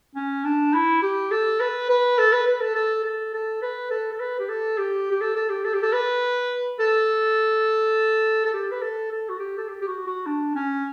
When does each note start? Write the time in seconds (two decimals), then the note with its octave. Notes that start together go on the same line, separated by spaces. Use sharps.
0.15 C#4
0.44 D4
0.74 E4
1.02 G4
1.31 A4
1.60 B4
1.89 B4
2.18 A4
2.32 B4
2.47 B4
2.61 A4
2.75 A4
3.04 A4
3.34 A4
3.62 B4
3.90 A4
4.12 A4
4.20 B4
4.39 G4
4.49 A4
4.78 G4
5.11 G4
5.21 A4
5.35 A4
5.49 G4
5.64 A4
5.74 G4
5.83 A4
5.93 B4
6.80 A4
8.45 A4
8.53 G4
8.71 B4
8.82 A4
9.11 A4
9.29 F#4
9.39 G4
9.58 A4
9.68 G4
9.82 G4
9.88 F#4
10.07 F#4
10.26 D4
10.55 C#4